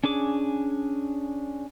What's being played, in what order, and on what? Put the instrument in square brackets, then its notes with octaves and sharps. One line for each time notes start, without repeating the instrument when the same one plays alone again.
[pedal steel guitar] C#4 D4 G#4 D6